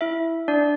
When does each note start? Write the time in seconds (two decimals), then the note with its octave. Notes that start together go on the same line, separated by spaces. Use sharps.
0.01 E4 E5
0.48 D4 D5